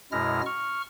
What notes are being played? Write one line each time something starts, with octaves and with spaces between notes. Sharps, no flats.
F#2 B2 G#3 E4 F6 A#6
C#6 F6